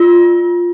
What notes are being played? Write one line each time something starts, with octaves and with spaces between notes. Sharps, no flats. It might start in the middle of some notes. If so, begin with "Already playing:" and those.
Already playing: F4